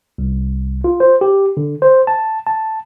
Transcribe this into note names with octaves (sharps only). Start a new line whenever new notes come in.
C2
F4
C5
G4
D3
C5
A5
A5